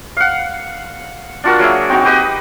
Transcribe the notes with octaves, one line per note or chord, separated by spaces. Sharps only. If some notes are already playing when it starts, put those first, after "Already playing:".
F5 F#5
D4 F4 F#4 A#4
F#3 A#3 G#4 E5
C4 D#4 F#4
G4 B4 D#5